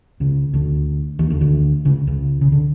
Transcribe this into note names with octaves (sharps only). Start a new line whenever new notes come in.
C#2 C#3
D2 D3
D#2 D#3
D2 D3
D2 D3
C#2 C#3
C#2 C#3
C#3
D3